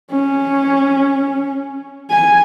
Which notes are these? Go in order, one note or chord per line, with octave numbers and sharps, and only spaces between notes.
C#4
G#5